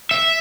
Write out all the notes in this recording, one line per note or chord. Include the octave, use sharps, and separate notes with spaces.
E5